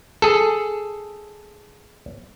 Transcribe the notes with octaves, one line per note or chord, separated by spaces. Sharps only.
G#4 A4